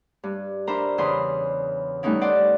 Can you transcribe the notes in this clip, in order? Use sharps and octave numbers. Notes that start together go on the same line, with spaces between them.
G2
D4 A#4 C5 E5 A#5 B5
E2 C#3 B5 C6 D#6
G3 A3 B3 C#4 D#4 E4
C5 D5 F#5